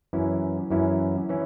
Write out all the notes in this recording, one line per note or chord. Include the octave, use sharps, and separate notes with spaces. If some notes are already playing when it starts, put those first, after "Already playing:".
F#2 E3 C#4 E4
F#2 E3 C#4 E4
E3 C#4 E4